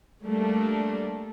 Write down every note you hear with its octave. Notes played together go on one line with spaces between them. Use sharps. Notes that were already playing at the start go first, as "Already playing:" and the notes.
G3 A3 A#3 D4